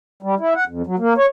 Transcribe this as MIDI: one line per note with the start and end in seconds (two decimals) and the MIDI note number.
0.23 0.35 55
0.40 0.53 64
0.56 0.64 78
0.68 0.82 41
0.87 0.96 54
0.99 1.14 58
1.18 1.26 73